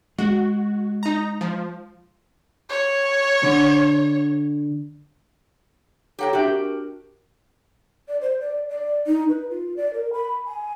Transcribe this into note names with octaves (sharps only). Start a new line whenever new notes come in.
G#3 F#4
D#4 A#5
F3
C#5
D3
G4 A4 C#5 F#5 G5 A#5
D4 F#4 G4 E5 G5
G4 A#4
D5
C5
D5
D5
D#4
B4
F4
D5
A#4
B5
G#5